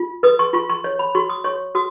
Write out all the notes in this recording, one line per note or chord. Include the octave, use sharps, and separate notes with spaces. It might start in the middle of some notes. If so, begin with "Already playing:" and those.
Already playing: F4
B4 D#6
C#6
F4 C#6
C#6
C#5
B5
F#4 C#6
D#6
C#5 C#6
F#4 D#6